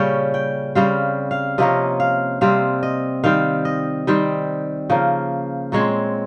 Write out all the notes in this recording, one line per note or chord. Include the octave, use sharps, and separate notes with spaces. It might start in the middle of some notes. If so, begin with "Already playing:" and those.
Already playing: A#2 C#3 G3 C#4 C#5 G5
G5
C#3 G3 C4 F5
F5
C3 F3 A#3 C#4 D#5
F5
C3 G3 C4 F5
D#5
D#3 G3 C4 F5
D#5
D#3 G3 C4
C#3 F3 A#3
A#2 G#3 C4 C#5